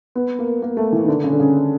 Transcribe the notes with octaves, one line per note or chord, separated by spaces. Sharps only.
B3
A#3
A#3
A3
E3
D#3
D3
C#3
D3
C#3